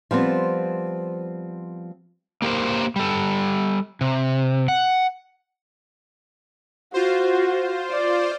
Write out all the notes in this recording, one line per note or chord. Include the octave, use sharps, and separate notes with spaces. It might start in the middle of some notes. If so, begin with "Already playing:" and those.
F3 G3 B3 C4
A#3 G4 A#4 C5
G3 A4
C3
F#5
F4 F#4 C5
D5